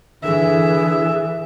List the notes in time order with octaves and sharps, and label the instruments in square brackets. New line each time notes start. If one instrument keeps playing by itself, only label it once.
[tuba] D3 [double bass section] E3 [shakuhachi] G#4 [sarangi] E5